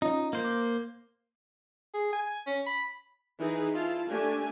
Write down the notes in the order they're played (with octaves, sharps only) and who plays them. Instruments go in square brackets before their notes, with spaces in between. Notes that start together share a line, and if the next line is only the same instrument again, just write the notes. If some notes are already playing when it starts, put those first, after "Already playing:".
[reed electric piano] C#4 F4 D#5 [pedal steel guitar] D#4
[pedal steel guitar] A#3 C5
[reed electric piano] D6
[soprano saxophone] G#4
G#5
C#4
B5
[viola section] E3 D#4 G#4 B4
E4 F4 A5
A3 D4 G4 G#5